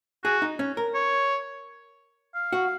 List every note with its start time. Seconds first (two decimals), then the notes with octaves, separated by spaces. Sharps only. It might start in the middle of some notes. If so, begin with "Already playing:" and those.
0.24 F#4 G#4
0.42 D#4
0.59 C#4
0.77 A#4
0.95 C#5
2.35 F5
2.53 F#4